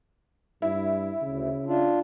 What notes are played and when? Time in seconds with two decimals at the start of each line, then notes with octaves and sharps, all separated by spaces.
0.62 G2 E4
1.22 D2 C#3
1.67 D4 F4